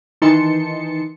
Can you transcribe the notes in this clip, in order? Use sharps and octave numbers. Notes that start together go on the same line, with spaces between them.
D#3 E3 D#4 A5 C6 C#7